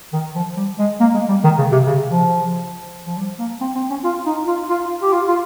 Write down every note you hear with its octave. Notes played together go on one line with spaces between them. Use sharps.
D#3
F3
G3
G#3
A#3
G#3
G3
D#3
C#3
C3
C#3
F3
F3
G3
A#3
C4
C4
C#4
F4
D#4
F4
F4
G4
F4
F4